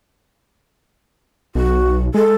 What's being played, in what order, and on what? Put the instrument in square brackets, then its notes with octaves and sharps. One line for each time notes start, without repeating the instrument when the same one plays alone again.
[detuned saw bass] B1 [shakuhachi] F#4
[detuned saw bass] G#3 [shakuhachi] A4